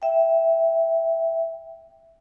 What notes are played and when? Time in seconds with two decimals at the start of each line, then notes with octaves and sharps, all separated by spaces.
0.02 E5 G5